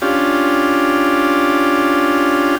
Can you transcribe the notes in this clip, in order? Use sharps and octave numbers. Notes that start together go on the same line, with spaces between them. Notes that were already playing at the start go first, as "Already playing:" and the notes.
C#4 D4 F4 G4